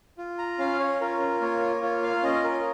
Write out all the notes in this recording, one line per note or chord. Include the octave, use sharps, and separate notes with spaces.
F4
A#5
C#4 F5
C#5
F4 A#4
A#3 C#5
F4 C#5
F5
C#4 D#5
A#4